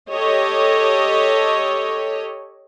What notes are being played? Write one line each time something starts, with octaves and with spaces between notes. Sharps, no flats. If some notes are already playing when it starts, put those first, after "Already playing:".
G4 A4 C#5 D#5